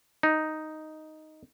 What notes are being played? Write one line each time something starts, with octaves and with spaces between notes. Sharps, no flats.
D#4